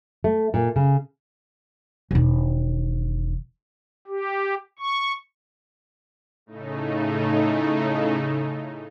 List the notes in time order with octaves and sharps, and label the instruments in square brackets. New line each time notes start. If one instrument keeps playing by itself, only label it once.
[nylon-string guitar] A3
A#2
C#3
[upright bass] E1 D#3
[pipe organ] G4
C#6
[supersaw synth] A2 C#3 A3 D#4